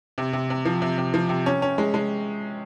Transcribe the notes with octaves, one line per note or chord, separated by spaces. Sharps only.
C3
C3
C3
F3
C3
C3
F3
C3
C#4
C#4
G#3
G#3